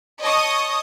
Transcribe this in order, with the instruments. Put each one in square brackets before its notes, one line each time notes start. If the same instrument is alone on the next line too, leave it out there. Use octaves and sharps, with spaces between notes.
[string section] C#5 D#5 A5 C#6 D#6